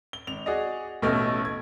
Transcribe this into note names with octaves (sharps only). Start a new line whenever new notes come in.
G7
G#1 F7
F#4 G#4 D5 D#5
A1 B2 A3 C#4 D#5 F6
G#6